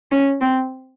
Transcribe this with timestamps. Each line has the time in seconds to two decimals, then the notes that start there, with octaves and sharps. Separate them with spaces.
0.12 C#4
0.41 C4